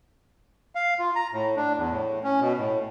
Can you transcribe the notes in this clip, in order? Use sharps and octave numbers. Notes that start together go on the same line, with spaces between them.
F5
F4
A#5
A2
D4
E2
A2
C#4
B2
A2